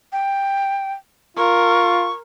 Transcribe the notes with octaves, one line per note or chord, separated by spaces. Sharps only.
G5
F4 A#4 C#6